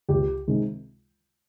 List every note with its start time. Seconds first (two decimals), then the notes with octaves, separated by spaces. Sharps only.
0.09 C#2 G4
0.48 C3 D#3 G#3